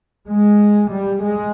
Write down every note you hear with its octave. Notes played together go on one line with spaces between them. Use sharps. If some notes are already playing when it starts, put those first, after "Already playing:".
G#3
G3
G#3